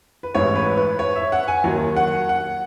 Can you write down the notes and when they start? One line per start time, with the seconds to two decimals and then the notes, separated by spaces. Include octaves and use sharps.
0.23 B4
0.35 A1 G#2 E3 C#5
0.55 B4
0.77 B4
0.99 C#5
1.16 E5
1.32 F#5
1.48 G#5
1.64 D#2 D#3 F#3
1.96 F#5
2.29 F#5